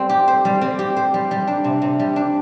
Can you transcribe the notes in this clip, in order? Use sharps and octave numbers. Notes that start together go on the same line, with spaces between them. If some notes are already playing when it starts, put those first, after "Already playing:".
Already playing: G3 C4
G4
C5
G3
C4
G4
C5
G3
G3
D4
C3
C3
G3
D4